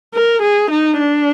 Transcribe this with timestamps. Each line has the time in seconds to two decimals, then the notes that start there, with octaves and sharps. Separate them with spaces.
0.14 A#4
0.42 G#4
0.71 D#4
1.00 D4